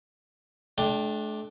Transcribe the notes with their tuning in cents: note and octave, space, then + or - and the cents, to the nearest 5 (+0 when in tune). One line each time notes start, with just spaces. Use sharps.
A3 -40 D4 +0 G5 +0